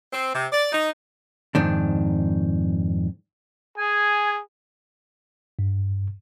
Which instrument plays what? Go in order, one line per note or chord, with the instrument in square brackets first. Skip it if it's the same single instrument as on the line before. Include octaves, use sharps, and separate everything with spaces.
[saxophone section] C4
C3
D5
D#4
[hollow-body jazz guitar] F2 G#2 D#3 D4
[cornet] G#4 [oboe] G#5
[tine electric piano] G2